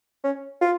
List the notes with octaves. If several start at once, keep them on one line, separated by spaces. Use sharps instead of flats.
C#4
F4